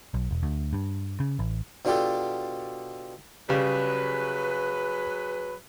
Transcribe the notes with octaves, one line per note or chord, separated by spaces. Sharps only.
B1
E1
D2
G2
C#3
A1
B2 D4 F4 G4 A4
C#3 F#3 G3 G#4 B4